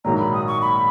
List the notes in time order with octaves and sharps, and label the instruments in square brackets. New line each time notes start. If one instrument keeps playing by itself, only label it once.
[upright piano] A#1 G#2 D#3 F#3 [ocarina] A#5
[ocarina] B5
D#6
C#6
B5